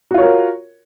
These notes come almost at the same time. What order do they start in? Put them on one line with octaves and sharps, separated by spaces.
F#4 F4 C#5 A#4